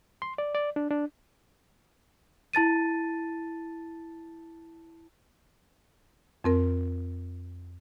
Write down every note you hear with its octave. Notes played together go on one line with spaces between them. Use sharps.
C6
D5
D5
D4
D4
E4 A5 A6 D#7
F2 C4 A#4